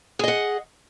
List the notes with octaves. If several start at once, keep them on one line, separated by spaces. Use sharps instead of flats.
G#4 D#5 F#5